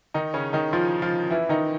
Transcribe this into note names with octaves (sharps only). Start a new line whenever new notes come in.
D#3 D#4
C#3 C#4
D#3 D#4
F3 F4
F3 F4
E3 E4
D#3 D#4